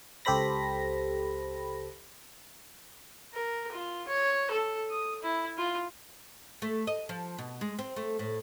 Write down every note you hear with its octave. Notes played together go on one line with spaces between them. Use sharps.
C#2 G4 A4 C5 B5 A#6
A#4
F4
C#5
A4
D#6
E4
F4
A3
D#5
F3
B2
G#3
C4
A3
A2